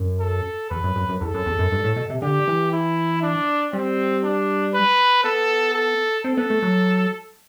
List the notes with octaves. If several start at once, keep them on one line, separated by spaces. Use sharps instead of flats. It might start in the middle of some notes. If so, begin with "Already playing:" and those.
Already playing: F#2
A4
E2 B4
F#2
F#2
F#2
E2 A4
F#2
E2
F#2
G2
A2
B2
C3
D3 G4
E3
E4
D4
G3 C4
D4
B4
B3 A4
A4
C4 A4
B3
A3
F#3